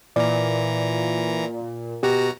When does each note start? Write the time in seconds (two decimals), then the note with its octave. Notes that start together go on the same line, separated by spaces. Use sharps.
0.16 A#2 E3 D5 A#5
2.03 B2 F#4 G4 A#5